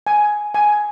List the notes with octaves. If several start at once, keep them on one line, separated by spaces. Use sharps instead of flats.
G#5
G#5